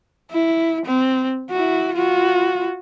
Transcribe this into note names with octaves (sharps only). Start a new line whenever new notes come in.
E4
C4
E4 F#4
F4 F#4